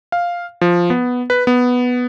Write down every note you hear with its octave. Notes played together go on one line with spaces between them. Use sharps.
F5
F3
B3
B4
B3